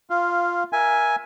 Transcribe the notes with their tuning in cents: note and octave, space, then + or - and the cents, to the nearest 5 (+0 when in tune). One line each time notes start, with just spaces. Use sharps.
F4 +0 F5 -10
A#4 +20 E5 +0 G#5 +0